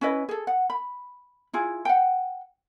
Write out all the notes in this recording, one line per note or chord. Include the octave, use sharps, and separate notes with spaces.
C#4 E4 B4 D#5
G#4 A4
F#5
B5
E4 F4 G#4
F#5 G5